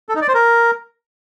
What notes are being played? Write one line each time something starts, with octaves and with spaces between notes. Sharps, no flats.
A4
D#4
D5
C5
A#4